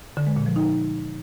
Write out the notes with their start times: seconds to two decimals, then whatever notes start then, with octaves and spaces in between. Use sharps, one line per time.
0.17 D3
0.27 G#3
0.36 A#2
0.46 F3
0.56 D#4